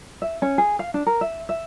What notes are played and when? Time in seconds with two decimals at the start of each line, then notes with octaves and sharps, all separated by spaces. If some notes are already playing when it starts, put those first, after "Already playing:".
0.22 E5
0.42 C#4
0.58 G#4
0.79 F5
0.94 D4
1.07 A#4
1.21 E5
1.49 E5